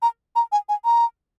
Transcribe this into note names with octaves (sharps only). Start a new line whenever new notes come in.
A#5
A#5
G#5
G#5
A#5